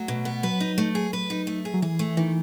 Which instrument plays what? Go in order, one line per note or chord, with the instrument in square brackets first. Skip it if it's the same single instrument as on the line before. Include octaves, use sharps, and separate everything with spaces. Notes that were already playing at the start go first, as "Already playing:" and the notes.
Already playing: [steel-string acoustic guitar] F#3 [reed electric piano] A3
[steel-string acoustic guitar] B2
B3
[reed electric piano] F#3 [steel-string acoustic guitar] B4
[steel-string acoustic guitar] D#4
A3
G#4
B4
D#4
A3
G#4
[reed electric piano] F#3
[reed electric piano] E3 [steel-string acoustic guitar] G#4
[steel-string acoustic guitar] A3
[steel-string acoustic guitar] D#3 [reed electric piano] E3